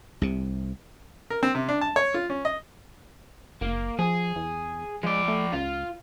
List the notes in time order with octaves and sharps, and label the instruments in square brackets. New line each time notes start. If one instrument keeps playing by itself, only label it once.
[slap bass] C2 C3
[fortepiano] A#4
C4
C3
D4
A5
C#5
F4
C#4
D#5
[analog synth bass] F#1 [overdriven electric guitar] A#3
[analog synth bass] F3 [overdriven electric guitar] G#4
[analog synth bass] E2
[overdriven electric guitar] F3 D5 [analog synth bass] G#3
[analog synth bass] A3
[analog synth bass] C#2 [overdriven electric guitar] F4